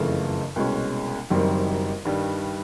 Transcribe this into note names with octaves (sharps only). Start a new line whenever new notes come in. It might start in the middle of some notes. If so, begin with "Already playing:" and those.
Already playing: F#1 F2 C#3 E3 A3
C2 B2 G#3 C#4
F#1 F#2 D#3 G3 C4
G2 D#3 G3